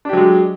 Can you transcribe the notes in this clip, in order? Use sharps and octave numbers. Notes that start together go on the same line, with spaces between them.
F#3 G#3 D4 G4